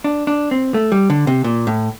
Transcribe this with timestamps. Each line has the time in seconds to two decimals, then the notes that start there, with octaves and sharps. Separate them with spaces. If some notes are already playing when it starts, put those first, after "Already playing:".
0.04 D4
0.27 D4
0.51 C4
0.74 A3
0.92 G3
1.10 D3
1.27 C3
1.44 A#2
1.67 A2